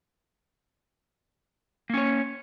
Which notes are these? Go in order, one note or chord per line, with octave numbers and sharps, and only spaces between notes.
A#3 C#4 C#5